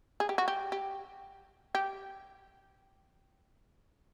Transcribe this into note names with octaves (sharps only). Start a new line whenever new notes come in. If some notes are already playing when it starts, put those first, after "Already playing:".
G#4
G4
F#4
G4
G4
G4